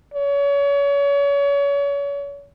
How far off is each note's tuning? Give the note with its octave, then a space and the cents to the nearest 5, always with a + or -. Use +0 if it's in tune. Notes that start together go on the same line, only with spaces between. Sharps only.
C#5 +35